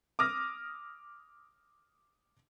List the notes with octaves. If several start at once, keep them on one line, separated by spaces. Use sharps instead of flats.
D6 D#6 F6 A#6